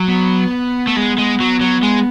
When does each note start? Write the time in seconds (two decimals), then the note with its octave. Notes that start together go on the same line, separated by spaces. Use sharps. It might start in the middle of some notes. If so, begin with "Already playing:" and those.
Already playing: F#3
0.08 B3
0.87 A3
0.97 G#3
1.18 G#3
1.40 F#3
1.61 F#3
1.83 G#3